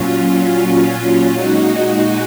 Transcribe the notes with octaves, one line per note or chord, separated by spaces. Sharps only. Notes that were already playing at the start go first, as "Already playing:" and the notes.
Already playing: A#2 F#3 C#4 F4
A#2 G#3 D#4 F#4